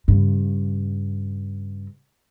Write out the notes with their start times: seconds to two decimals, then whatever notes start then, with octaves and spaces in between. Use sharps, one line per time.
0.08 G2 C#3